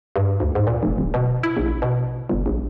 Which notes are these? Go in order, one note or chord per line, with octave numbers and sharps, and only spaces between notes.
G2
D2
G#2
A#2
F1
D1
B2
E4
A#1
B2
G1
A#1